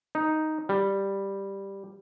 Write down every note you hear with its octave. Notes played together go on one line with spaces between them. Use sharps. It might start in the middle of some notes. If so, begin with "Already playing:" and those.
D#4
G3